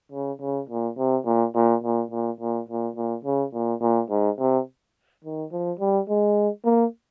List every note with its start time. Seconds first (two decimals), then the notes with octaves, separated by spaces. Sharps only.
0.12 C#3
0.41 C#3
0.70 A#2
0.98 C3
1.26 A#2
1.55 A#2
1.84 A#2
2.11 A#2
2.40 A#2
2.69 A#2
2.96 A#2
3.25 C#3
3.54 A#2
3.81 A#2
4.10 G#2
4.39 C3
5.24 D#3
5.52 F3
5.80 G3
6.09 G#3
6.65 A#3